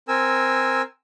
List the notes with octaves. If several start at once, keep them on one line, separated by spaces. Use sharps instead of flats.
C4 A#4 G#5 E6